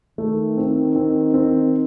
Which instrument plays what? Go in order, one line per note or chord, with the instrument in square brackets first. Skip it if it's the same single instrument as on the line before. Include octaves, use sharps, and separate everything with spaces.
[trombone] D#3 [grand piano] A3
[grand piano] C4
C4
C4